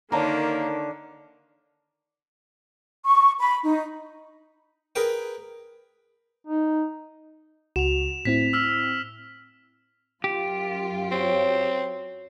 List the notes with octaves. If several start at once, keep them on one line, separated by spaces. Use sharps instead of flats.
D3 D#3 A#3 C#5 A5 A#5
C#6
B5
D#4
G#4 A#4 B4 G5
D#4
C#2 F#4 E7 F7
A2 C4 E4 B6
E6 F6 B6
F#2 F4 G4
C4 F#4 C#5